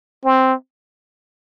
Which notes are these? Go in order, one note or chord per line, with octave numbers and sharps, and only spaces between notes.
C4